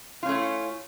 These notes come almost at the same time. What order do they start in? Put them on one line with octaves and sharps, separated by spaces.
F4 C#4 A3 E4